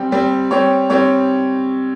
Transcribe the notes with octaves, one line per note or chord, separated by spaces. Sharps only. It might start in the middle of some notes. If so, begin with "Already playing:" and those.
Already playing: G3 C4 G4
G3 C4 G4
G3 C4 G4 C#5
G3 C4 G4 C#5